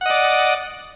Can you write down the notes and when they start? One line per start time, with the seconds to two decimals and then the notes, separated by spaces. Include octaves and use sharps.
0.01 F#5
0.06 D#5
0.10 D5